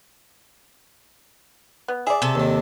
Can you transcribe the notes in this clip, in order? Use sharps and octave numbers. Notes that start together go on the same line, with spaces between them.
B3
G#4 D5 E5
C3 A4
D#2 D#3